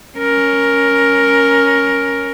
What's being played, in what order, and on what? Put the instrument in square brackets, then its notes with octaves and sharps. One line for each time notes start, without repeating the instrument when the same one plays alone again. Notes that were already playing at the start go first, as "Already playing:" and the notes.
[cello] C#4 A#4